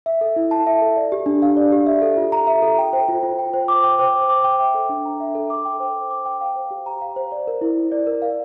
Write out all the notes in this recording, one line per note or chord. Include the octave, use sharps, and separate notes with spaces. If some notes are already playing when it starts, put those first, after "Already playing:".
E5
A4
E4
A5
E5
A4
D5
G4
D4
F5
D5
G4
E5
A4
F4
A#5
E5
A4
G5
C5
F4
F4
G5
C5
D6
G5
C5
C5
D6
G5
E5
A4
D4
A#5
E5
A4
D6
G5
C5
C5
D6
G5
F5
C5
G4
A#5
F5
C5
D5
A#4
E4
E4
D5
A#4
F5